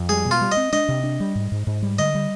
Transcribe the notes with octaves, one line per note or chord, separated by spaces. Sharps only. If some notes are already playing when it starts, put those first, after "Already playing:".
Already playing: F2
G3 G#4
B2
F4
G3
D#5
C4
D4 D#5
C3
D4
G3
G#2
G#2
G#2
G3
D3 D#5
G3